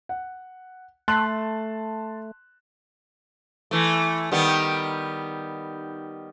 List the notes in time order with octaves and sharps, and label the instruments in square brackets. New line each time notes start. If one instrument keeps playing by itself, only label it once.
[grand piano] F#5
[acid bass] A3 [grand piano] A5 C6 F#6
[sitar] E3 A3
D#3 G3 B3